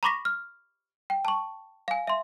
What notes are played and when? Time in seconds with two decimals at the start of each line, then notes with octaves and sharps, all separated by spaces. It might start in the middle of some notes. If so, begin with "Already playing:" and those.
0.03 A#5 B5 C#6 D6 A#6 B6
0.25 F6
1.10 G5
1.25 A5 C#6
1.88 F5 G#5
2.07 E5 C6